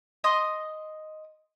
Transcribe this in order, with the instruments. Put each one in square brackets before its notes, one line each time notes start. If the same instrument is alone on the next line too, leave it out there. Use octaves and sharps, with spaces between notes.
[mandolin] D#5 C6 D#6